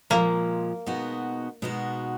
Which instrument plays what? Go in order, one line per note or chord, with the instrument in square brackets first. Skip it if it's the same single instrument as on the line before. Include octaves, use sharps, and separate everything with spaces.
[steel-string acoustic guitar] A#2 F3 G#3 [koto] A#3
[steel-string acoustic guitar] B2 G#3 B3 D#4 F#4
B2 G#3 B3 D#4 F#4